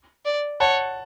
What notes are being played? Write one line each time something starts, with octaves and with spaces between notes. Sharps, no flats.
D5
C#5 F#5 A5